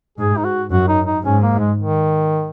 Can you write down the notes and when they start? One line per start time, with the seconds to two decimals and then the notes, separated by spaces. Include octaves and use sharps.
0.18 G#2 G#4
0.37 D#4
0.45 F#4
0.71 F#2 F#4
0.89 D#4
1.07 D#4
1.24 G#2 C#4
1.42 A#3
1.59 G#3
1.78 D#3